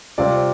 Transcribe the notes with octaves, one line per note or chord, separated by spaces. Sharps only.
C3 G3 C4 F4 D5